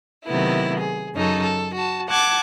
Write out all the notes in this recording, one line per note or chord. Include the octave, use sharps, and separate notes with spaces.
C3 D#3 F#3 A3 B3 E4
G#4
F#2 C#3 D#4 A4
A4
F#4 A5
F#5 A5 D6 G#6